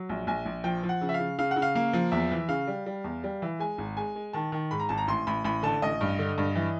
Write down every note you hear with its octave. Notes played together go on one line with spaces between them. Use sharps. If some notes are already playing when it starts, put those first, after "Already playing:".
Already playing: F#3
A#1
A#1 G#5
A#1
F3 G5
F3
F#5
C#3
E5
F5
C#3
C#3 F5
F#5
C#3
F5
A#3 F5
F3
E2 E5
E3
C#3 F5
G3
G3
E2
G3
E3
G#3 G#5
G#1
G#3 G#5
G#3
D#3 A5
D#3
G#2 B5
A#5
G#1 A5
A#5
A1 C6
A1 B5
A1 B5
D3 A5
A1 D#5
G2
D3
G2
E3